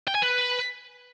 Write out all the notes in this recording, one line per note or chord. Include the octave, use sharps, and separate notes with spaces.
G5
G#5
B4